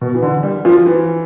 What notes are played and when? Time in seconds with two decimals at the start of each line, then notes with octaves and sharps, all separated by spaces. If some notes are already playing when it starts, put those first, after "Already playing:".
0.01 B2
0.15 E3
0.22 D3
0.43 G3
0.65 F3
0.86 E3